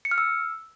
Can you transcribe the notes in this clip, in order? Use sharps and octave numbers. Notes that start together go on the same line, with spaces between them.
C#7
F6
E6